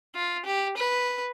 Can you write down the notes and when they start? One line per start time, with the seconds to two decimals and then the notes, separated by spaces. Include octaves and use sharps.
0.15 F4
0.45 G4
0.77 B4